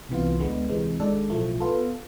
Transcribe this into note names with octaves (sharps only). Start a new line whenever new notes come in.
C2 C3 E3 B3 F4
D2 D3 G#3 B3
D2 C3 E3 G#3
G#1 G#2 G#3 D4 A4
B1 A2 F3 A3
B3 F4 A4